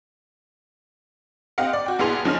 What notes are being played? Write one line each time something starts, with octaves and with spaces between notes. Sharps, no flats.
C4 G4 D#5 F5 F#5
D5
F#4 G5
B1 B3 E4 G#4 C6 F7
F#1 F3 G#3 C#4 D#5 F6